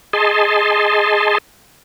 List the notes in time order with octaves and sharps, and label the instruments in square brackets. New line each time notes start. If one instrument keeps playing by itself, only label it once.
[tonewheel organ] G#4 D#5 A5 C6